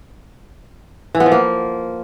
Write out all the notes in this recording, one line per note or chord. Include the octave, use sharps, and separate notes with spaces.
E3
B3
F3
A#3